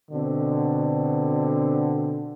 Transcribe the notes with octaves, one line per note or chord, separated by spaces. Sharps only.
B2 D3 C4